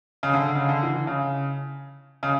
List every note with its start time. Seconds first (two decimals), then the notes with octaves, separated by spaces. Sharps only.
0.23 C#3
0.33 D3
0.55 C#3
0.69 D3
0.83 E3
1.07 C#3
2.23 C#3